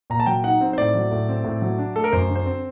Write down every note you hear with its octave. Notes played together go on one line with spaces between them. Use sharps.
A#2 A#5
A5
F#3 G5
D#4 F#5
C4
C5
A2 D5
F#3
A2
C4
A2
F#3
D4
A3 A4
A#4
F#2 C5
D3
C5
C4